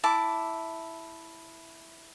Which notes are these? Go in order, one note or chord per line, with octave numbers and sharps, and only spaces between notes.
E4 A5 D6